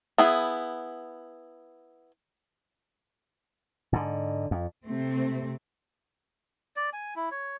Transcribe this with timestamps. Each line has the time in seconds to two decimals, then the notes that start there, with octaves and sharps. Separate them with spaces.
0.18 B3 E4 G#4
3.93 G#2 D3
4.51 F2
4.85 C3 A3 C4
6.76 D5
6.93 G#5
7.16 E4
7.31 C#5